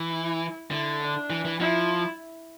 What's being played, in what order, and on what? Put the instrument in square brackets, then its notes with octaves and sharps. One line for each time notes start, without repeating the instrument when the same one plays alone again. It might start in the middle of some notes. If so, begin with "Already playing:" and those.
Already playing: [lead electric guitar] E3
[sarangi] E4
[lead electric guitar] D3 [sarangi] E4
[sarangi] D4
[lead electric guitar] E3
E3
[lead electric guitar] F3 [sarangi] E4